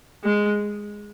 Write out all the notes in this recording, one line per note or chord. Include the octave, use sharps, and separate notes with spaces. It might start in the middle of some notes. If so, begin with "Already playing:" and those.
G#3